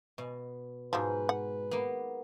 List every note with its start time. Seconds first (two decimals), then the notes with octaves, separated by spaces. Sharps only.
0.18 B2
0.93 G#2 F3 F#3 B4
1.29 F#5
1.71 A#3 B3